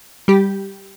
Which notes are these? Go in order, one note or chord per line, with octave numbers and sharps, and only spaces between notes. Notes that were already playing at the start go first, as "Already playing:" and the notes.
G3 G4